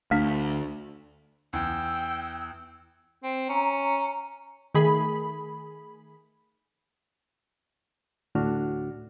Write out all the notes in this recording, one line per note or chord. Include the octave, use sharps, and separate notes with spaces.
D2 A3 D4
E2 G5 E6
C4
C#4 A#5
D#3 A3 G#4 B5
D2 A2 D4 F#4 F6